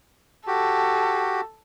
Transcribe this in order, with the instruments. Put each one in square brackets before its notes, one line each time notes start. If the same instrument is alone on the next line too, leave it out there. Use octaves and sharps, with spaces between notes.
[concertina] F#4 G4 [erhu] A4